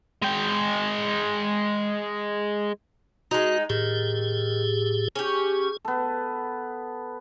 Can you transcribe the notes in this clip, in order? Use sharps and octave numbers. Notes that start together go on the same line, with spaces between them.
G#3 G5
G#3 D#4 F#4
A2 D#3 G4 G#4
C#4 G4 G#4
B3 A4